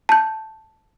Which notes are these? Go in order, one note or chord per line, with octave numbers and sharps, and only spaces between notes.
A5 G6